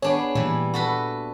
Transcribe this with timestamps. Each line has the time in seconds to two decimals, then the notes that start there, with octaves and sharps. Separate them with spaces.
0.02 B3 D4 G#4 C#5
0.35 A#2 E3 G3
0.74 F#4 A4 B4